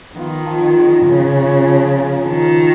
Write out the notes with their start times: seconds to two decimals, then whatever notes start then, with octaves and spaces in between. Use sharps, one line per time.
0.16 D#3 B3 F4
0.45 F3
0.76 G#3 C#4
1.06 C#3 F3
1.37 G#3 C#4
1.66 F3
1.97 A#3 F4
2.26 D#3 F3
2.57 F4